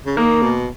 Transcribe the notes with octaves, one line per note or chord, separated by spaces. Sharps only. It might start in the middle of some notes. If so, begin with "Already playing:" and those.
C#3
D#3 A#3
B2